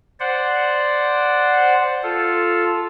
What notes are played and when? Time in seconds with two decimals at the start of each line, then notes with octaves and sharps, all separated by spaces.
0.20 C5 D5 F#5
2.03 F4 A4